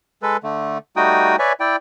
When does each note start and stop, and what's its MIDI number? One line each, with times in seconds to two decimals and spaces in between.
0.22 0.37 56
0.22 0.37 69
0.22 0.37 71
0.43 0.78 50
0.43 0.78 57
0.96 1.36 55
0.96 1.36 57
0.96 1.36 63
0.96 1.36 66
0.96 1.36 79
0.96 1.36 87
1.39 1.53 71
1.39 1.53 73
1.39 1.53 74
1.39 1.53 76
1.39 1.53 80
1.60 1.76 64
1.60 1.76 74
1.60 1.76 79